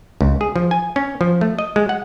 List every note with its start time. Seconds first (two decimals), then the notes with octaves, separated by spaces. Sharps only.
0.21 C#2
0.41 G#4
0.56 F3
0.71 G#5
0.96 C#4
1.21 F3
1.41 A3
1.59 D#5
1.76 G#3
1.89 F#5